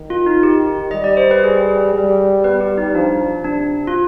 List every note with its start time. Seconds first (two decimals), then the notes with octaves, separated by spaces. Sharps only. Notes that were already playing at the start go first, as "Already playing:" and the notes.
Already playing: D#3
0.10 F4
0.26 D#4
0.43 G4
0.91 G3 D#5
1.04 D5
1.17 C5
1.31 B4
1.44 G#4
1.94 G3
2.44 B3 B4
2.61 G4
2.78 D#4
2.95 F3 D4
3.44 C3 D4
3.87 F4